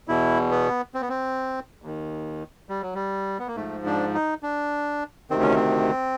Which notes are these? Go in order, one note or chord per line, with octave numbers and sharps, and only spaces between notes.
E2 B2 E4
B3
C4
B3
C4
D#2 D#3
G3
F#3
G3
B3
A#3
G#2 F3 A3
D4
D#4
D4
D2 C3 D#3 C4
C#4
C4